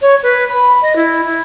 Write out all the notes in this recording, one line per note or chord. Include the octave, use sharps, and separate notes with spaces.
C#5
B4
B5
D#5
E4
E4